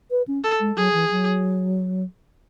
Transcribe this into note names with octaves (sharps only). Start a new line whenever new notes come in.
B4
C#4
A4
G#3
F#3 G#4
E3
F#3